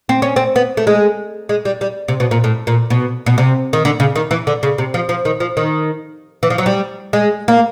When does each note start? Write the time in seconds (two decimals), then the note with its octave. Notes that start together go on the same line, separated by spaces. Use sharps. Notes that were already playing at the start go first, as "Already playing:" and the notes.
0.09 C4
0.22 C#4
0.36 C4
0.56 B3
0.77 A3
0.87 G#3
1.49 G#3
1.65 G3
1.81 G3
2.08 C3
2.20 B2
2.31 A#2
2.44 A2
2.67 A#2
2.90 B2
3.26 B2
3.38 C3
3.73 D#3
3.85 D3
4.00 C#3
4.16 D#3
4.31 E3
4.47 D3
4.63 C#3
4.78 C3
4.94 F3
5.09 F3
5.25 D#3
5.40 F3
5.57 D#3
6.43 E3
6.50 F3
6.58 F#3
6.66 G3
7.13 G#3
7.48 A#3